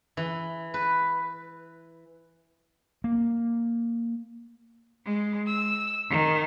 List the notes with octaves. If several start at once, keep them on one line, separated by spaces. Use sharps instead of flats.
E3
B4
A#3
G#3
E6
D#3